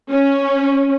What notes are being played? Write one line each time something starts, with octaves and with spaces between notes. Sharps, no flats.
C#4